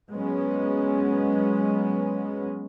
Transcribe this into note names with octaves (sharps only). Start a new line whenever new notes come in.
F#3 G#3 B3 C#4